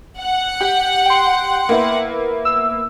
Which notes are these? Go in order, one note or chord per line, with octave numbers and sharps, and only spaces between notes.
F#5
G4
G5 C6
A#3 B3 E4
E6